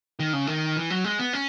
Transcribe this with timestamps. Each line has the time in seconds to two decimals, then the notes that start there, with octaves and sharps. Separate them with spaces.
0.20 D#3
0.33 C#3
0.47 D#3
0.76 E3
0.90 F#3
1.04 G#3
1.19 B3
1.33 C#4